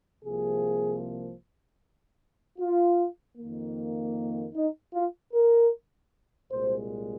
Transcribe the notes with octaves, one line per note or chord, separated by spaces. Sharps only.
C2 C3 F3 A#3 G#4
F4
F2 D#3 A#3
D#4
F4
A#4
C2 A#2 G#3 C5